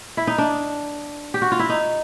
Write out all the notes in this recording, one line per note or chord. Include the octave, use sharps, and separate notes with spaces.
E4
D#4
D4
G4
F#4
F4
E4
D#4